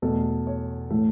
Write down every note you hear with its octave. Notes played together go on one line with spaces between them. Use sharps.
E2 B2 A3 A4
C#5
A2 E3 A3